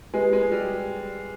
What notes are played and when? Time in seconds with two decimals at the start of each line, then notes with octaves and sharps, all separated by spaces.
0.14 G#3 G4 B4 D#5 G#5
0.33 G#3
0.52 G3